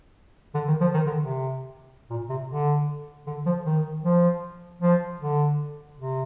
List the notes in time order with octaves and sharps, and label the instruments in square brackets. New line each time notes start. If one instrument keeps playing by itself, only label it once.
[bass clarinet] D3
D#3
F3
D#3
D3
C3
A#2
C3
D3
D3
F3
D#3
F3
F3
D3
C3